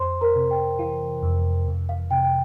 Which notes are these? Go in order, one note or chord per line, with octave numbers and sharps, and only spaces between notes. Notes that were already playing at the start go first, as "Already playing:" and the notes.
Already playing: F2 C5 C6
A#4 A#5
C3
G5
E3 F5
F2
F2
F5
C3 G5
G5